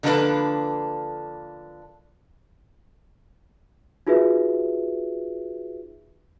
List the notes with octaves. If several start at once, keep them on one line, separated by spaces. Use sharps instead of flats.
D3 F3 A#3 D4 A4 B4
D#4 F4 F#4 G#4 B4 E5